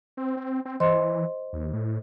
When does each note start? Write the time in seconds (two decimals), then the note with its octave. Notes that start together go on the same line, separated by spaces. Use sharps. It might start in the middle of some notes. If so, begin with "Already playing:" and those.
0.17 C4
0.37 C4
0.65 C4
0.80 E3 C5 D#5 C6
1.53 D#2
1.73 A2